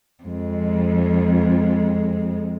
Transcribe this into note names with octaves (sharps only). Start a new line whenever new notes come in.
F2 G#3